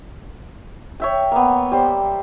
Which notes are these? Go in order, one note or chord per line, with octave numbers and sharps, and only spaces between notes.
C#5 E5 G5
A#3 B3
G3 C5